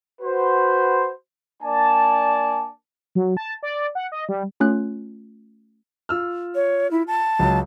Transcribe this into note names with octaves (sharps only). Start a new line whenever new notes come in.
F#4 B4 C5
A#3 D4 D5 G#5 A5
F#3
A5
D5
F#5
D#5
G3
A3 C#4 F4 F#6
F4 E6 F6
C#5
E4
A5
C#2 F#3